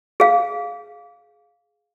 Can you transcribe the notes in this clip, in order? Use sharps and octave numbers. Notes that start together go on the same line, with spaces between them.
G#4 F5